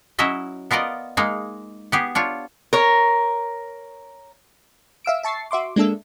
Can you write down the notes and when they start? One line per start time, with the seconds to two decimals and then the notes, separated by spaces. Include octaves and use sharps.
0.19 F#3 C#4 E4 D#5 E5
0.71 B3 F4 A#4 D5 D#5
1.17 G#3 A#3 D#4
1.92 B3 G4 G#4
2.15 D4 F4 C#5
2.73 A#4 C#5
5.05 E5 F5 E6 D7
5.23 E5 A5 C#6 A6 C7
5.51 F#4 E5 C6 D6
5.76 G#3 A#3 D4 A4 E5